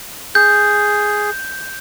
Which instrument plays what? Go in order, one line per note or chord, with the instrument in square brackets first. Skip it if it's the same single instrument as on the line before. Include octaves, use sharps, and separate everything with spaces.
[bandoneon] G#4 [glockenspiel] G6